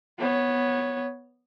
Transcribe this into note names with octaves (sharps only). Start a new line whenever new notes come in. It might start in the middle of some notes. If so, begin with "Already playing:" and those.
B3 C#5